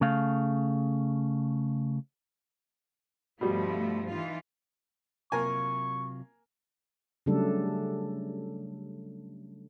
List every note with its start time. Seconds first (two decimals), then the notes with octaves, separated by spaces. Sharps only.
0.01 C#3 A3 F5
3.41 G2 B2 F3 G3 A3
4.10 E3 D#4 F4
5.32 C3 F#3 A#3 F4 A#4 G#5 C#6
7.26 C#3 F#3 G3 A3 D4 A4